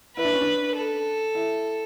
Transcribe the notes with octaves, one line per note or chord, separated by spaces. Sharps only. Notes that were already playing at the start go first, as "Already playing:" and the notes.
E4 B4
D4
C#4
D4
A4
E4